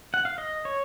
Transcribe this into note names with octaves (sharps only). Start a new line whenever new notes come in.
F#5
F5
D#5
C#5